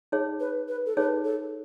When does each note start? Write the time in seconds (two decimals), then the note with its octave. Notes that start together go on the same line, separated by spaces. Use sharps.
0.12 D#4 G#4 C#5
0.40 B4
0.68 B4
0.86 A4
0.97 D#4 G#4 B4 C#5
1.25 A4